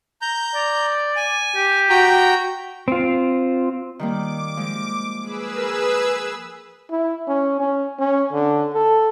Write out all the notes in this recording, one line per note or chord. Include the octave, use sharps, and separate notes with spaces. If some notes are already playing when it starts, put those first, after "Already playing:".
A#5 G6
D5
G#5
G4
F#4 G5 A#5
C4 F4
D#3 G3 A#3 D6
F3 G#3
G#4 B4 E6
A#4
E4
C#4
C#4
C#4
D3
A4